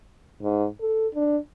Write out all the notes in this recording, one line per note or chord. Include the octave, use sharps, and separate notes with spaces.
G#2
A4
D4